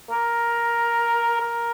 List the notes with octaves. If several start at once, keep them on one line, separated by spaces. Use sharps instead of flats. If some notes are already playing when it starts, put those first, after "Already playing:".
A#4
A#4